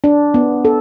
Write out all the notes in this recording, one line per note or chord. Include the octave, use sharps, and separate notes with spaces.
D4
B3
A4